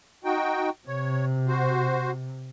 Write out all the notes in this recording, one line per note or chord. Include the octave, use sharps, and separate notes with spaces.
D#4 F#4 G5
C3 C#5
F#4 C5